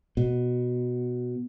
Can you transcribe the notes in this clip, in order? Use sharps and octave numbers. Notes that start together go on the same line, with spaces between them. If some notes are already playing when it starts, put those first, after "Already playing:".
B2